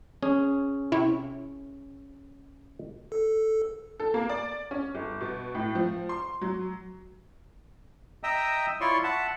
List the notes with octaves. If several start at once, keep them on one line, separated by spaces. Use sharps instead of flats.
C#4 G#4
C3 E4 C#5
A4
A4
A#3
D5
C#4
G1
B2
A2
F3
C6
F#3
D#5 E5 G5 A#5 D#6 E6
E4 F4 C#5 D5 C6 C#6
E5 F#5 A5